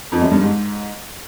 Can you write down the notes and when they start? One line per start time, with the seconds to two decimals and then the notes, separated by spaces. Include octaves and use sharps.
0.12 F2
0.22 F#2
0.31 G2
0.41 G#2